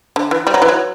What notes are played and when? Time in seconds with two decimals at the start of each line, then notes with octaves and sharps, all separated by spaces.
0.16 D3
0.31 E3
0.47 G3
0.54 F#3
0.62 E3
0.68 F#3